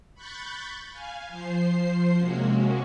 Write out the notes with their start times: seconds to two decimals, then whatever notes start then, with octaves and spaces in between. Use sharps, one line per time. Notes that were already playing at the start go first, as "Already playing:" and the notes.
0.15 B5 C#6 F#6 G6 A6
0.92 F5 G#5
1.27 F3 C5 C7
2.17 C3 G#3 A#3 C#4 F#4